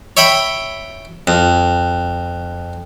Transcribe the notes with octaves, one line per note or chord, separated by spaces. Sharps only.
C#5 E5 G5 B5
F2